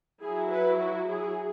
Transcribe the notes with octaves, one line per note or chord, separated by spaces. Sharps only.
F#3 E4 G#4
B4
F#4
G#4